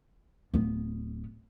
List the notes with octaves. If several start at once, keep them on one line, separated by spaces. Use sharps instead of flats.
D1 B3